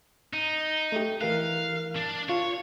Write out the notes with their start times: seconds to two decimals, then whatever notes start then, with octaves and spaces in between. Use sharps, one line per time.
0.33 D#4
0.92 A3 G4
1.21 E3 A#4 F5 F#6
1.96 D4
2.29 F4 C#5